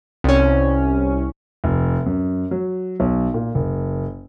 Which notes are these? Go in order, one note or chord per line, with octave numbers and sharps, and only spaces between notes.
C2 C#4
F1
F#2
F#3
B1
A#2
F#1